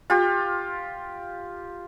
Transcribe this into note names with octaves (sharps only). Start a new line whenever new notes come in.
F4 G4